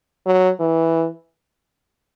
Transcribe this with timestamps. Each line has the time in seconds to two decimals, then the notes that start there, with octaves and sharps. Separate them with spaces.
0.26 F#3
0.60 E3